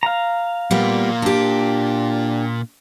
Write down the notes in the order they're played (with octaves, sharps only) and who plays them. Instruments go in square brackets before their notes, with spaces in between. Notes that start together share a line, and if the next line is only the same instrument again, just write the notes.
[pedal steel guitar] F5 A#5
[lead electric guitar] A#2 A#3 [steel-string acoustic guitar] G3 B3
[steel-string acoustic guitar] D4 G4